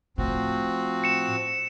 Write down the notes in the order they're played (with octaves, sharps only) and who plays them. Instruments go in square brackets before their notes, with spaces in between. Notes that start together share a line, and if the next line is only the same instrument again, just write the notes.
[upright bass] A2 [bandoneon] F3 C4 F#4
[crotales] C#7 E7